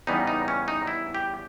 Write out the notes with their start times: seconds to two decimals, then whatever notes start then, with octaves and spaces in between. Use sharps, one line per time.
0.07 E2 C#3 G3 B3 D#4
0.27 D#4
0.48 C#4
0.68 D#4
0.87 E4
1.14 G4